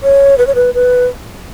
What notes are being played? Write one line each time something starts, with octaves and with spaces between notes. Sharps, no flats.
C#5
B4
C#5
B4
B4